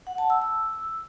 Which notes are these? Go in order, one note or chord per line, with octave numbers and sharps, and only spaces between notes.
F#5
A5
E6
E6